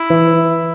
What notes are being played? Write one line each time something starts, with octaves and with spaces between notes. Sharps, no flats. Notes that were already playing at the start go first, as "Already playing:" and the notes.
Already playing: E4
E3